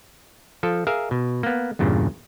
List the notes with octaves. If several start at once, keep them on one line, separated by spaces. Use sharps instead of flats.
F3 A4
G#4 A#4 E5 F5
B2
A#3 B3
E2 G2 A#2 C#3